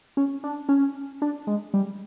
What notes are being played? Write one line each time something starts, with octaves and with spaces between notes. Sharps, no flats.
C#4
D4
C#4
D4
G#3
G3